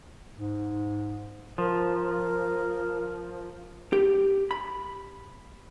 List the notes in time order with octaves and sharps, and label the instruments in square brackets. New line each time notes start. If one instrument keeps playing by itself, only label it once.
[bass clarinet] G#2
[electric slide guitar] F3 [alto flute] A#4
[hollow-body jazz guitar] G4
B5